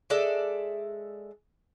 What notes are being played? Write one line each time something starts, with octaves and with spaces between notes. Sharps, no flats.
G#3 A4 D5 E5